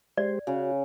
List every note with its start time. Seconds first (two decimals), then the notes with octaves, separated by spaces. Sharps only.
0.18 G#3 G4 C5 D5
0.47 C#3 F#4